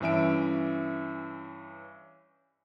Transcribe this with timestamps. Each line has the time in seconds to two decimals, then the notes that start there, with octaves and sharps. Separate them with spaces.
0.01 G2 E3 C#4 E5 D7